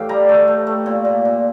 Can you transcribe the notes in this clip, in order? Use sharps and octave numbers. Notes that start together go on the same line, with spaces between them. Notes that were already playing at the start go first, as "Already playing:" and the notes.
Already playing: A2 E3 G4 F5 G5
G3 A#5
A3
A3
A3
A#2
A#2
A#2